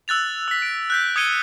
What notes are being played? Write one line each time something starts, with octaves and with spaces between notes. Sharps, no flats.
E6 F#6 A6 F7
E6 B6
D7
F#6 G6 B6
D#6 G#6 C#7 D#7 G7